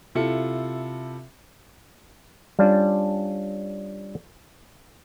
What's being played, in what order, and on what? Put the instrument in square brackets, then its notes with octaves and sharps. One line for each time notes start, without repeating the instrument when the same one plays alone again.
[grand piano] C3 E4 F4 A4 C#7
[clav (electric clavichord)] G3 C#4 D4 F4